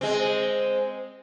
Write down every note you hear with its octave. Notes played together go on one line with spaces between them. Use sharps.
G#3 C4